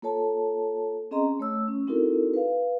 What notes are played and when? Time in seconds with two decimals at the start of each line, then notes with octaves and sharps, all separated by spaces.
0.02 A#3 F4 A4 C#5 A5
1.11 C4 C#4 G#4 D#5 A#5 C6
1.39 A3 C#5 E6
1.68 C#4
1.87 C4 D#4 E4 F#4 A4 A#4
2.34 B4 F5